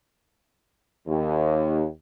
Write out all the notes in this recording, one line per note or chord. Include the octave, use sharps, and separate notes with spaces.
D#2